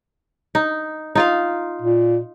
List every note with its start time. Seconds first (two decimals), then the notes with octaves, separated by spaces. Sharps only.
0.55 D#4
1.15 D#4 F4 F5
1.82 A#2